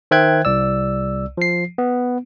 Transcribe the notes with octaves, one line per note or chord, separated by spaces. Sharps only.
D#3 C5 E5 G5 F#6 G#6
C2 D5 E6
F3 C7
B3